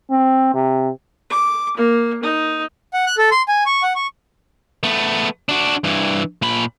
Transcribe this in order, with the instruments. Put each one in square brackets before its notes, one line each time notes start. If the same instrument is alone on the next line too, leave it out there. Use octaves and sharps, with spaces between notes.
[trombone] C4
C3
[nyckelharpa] D6
A#3
D#4
[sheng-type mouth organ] F#5
F#6
A4
C6
G#5
C#6
F#5
C#6
[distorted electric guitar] A3 B3
D4 F#4
G2 E3
A#2 B5